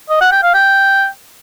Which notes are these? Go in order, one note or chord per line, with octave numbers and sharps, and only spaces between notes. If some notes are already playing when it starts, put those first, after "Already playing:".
D#5
F#5
G5
F5
G5